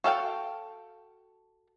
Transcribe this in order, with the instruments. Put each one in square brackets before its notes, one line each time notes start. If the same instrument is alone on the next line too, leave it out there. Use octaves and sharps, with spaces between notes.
[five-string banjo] F#4 A4 F5 G5